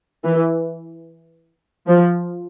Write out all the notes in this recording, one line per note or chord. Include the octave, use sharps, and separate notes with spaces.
E3
F3